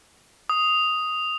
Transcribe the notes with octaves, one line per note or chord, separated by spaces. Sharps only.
D#6